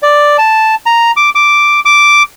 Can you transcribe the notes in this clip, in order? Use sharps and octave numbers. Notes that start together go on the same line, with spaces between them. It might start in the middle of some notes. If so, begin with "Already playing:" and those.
D5
A5
A#5
D6
D6
D6